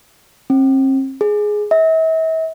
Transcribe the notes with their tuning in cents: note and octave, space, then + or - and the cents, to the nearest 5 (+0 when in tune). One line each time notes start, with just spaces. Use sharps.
C4 +40
G#4 +5
E5 -40